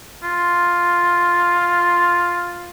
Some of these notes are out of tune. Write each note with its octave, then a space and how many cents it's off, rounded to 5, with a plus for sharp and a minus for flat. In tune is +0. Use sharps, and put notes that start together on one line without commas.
F4 +5